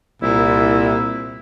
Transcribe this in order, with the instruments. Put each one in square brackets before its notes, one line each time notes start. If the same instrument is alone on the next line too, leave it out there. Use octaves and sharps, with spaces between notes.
[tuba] C2 [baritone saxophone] A#2 [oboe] E4